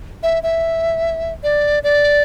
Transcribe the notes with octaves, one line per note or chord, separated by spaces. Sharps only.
E5
E5
D5
D5